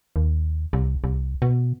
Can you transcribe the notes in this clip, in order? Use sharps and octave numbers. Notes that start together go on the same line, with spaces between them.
D#2
C2
C2
B2